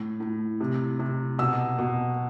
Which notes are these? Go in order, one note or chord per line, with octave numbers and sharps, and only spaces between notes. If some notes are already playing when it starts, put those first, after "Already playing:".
Already playing: A2
A2
C3
C3
B2 E6
B2